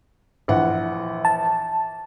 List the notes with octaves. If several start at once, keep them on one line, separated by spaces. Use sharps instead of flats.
A#1 E3 F#5
A5